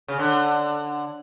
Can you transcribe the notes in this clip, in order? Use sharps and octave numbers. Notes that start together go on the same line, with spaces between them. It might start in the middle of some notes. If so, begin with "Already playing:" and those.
C#3
D3